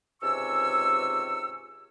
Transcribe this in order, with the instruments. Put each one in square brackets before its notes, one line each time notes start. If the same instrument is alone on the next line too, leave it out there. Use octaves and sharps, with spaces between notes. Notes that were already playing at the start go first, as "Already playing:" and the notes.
[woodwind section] C#2 G#2 C3 G#5 C#6 E6